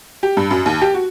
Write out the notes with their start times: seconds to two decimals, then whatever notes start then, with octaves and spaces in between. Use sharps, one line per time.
0.23 G4
0.37 G2
0.51 F#2
0.66 D#2
0.81 G4
0.94 F#4